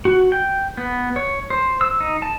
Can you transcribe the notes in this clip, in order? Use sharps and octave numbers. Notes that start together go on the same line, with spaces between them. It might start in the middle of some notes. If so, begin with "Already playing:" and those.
F#4
G5
B3
C#5
C5
E6
D#4
A5